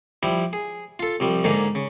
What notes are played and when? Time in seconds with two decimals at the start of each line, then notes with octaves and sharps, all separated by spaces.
0.23 F3 G3 E4
0.53 G#4
0.99 F4 A4
1.20 C2 F3 G3
1.44 G#2 D3 A#3 D#4 G#4
1.75 C#3